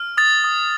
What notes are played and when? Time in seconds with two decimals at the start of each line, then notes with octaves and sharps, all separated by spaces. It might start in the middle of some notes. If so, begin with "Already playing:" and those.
Already playing: F6
0.17 D#6 A6
0.44 D#6